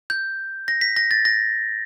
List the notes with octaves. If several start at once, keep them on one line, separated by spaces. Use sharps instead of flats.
G6
A#6
B6
A#6
A6
A#6